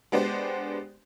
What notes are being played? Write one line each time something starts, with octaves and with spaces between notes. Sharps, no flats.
G#3 B3 D4 G4 C5